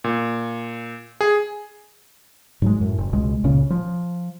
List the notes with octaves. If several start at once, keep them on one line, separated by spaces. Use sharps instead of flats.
A#2
G#4
G#2 F#3 G#3
F#2 A2
F#1
C#2 B2 G#3
C#2 A#2 C#3 C#4
F3